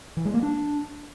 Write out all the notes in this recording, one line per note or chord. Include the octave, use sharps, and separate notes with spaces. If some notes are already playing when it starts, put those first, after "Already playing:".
E3
G#3
A#3
D4